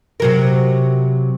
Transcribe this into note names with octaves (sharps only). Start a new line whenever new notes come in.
C3 F#3 A#4